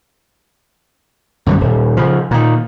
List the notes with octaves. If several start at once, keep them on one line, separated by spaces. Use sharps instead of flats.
F#2 D3 F3 G3
D#1
C#3 F3
A#2 D#3